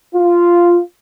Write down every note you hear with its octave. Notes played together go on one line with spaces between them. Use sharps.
F4